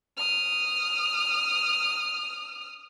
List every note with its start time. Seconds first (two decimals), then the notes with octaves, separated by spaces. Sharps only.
0.17 D#6 F6